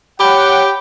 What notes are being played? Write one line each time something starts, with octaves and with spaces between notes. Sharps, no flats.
G4 C#5 F#5 G5 B5